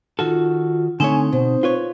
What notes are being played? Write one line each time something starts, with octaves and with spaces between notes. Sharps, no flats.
D#3 F4 F#4 A4
D3 A3 C4 D#4 C#5 G#5
B2 C5
F4 B4 C#5